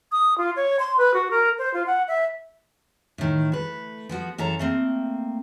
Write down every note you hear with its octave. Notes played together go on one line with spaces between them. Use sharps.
D#6
F4
C#5
C6
B4
F#4
A#4
C5
F4
F#5
E5
A2 D#3
A3 B4
F3 B3 F#4
F#2 E3 A4 C#5 A#5
A3 A#3 C4